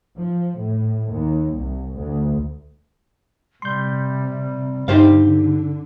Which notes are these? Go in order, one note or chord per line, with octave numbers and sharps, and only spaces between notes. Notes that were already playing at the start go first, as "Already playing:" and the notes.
F3
A2
D#2
C2
D2
C3 G3 C6 G6
G2 D3 D#4 G4 C5 F5